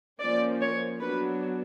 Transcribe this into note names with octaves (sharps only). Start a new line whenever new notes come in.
F3 A#3 C#4 D5
C#5
F#3 B3 D4 B4